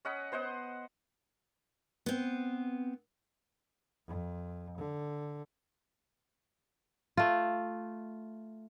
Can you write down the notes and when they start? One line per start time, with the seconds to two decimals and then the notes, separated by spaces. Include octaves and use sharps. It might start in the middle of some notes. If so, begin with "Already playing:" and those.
0.05 C#4 D#5 F#5 B5
0.32 B3 C5 D#5 F#5
2.06 B3 C4
4.07 F2
4.78 D3
7.17 A3 F4